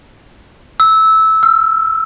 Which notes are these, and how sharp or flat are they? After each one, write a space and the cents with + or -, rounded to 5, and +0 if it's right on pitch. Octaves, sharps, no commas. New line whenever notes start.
E6 -15
E6 +35